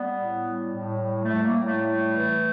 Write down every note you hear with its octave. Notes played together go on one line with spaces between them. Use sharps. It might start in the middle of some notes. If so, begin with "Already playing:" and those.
Already playing: G3 B3
A2
G3
A2
G3
A3
G3
A#3
A2
A3
G3 A3
E3